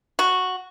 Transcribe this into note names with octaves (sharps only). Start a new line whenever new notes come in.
F#4